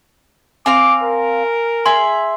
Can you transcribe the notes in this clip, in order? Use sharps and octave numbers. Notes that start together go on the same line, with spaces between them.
C4 F5 G#5 D6
A#4
G#4 E5 C6